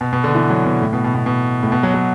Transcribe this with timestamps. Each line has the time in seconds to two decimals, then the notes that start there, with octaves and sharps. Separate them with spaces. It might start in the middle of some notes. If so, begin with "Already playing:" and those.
0.01 B2
0.13 B2
0.24 D3
0.35 E3
0.50 F#3
0.66 B2
0.81 A2
0.93 B2
1.04 B2
1.15 B2
1.26 B2
1.63 A2
1.72 B2
1.83 F#3
1.94 F#3